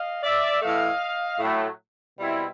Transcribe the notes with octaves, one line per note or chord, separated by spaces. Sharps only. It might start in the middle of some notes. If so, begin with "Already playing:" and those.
Already playing: D#5 F5
D5 E5
A2 E3 A3 D#5 F5
A2 F#3 A3
B2 G3 C4 E4